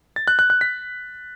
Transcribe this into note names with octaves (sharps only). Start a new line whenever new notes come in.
A6
F#6
F#6
F#6
B6